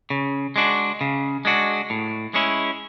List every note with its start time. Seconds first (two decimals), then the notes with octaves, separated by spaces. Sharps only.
0.10 C#3
0.56 G#3 D4 F#4
1.01 C#3
1.45 G#3 D4 F#4
1.90 A2
2.34 G#3 C#4 E4